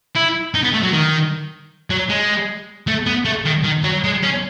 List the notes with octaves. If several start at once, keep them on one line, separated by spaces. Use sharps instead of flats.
E4
D#4
B3
A3
F#3
D#3
F#3
G#3
A3
B3
A3
D#3
D#3
F#3
G#3
C#4